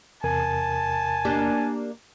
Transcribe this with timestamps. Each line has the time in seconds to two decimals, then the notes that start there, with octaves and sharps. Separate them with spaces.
0.24 E2 C3 A#4 G#5 A5
1.25 A#3 D4 G4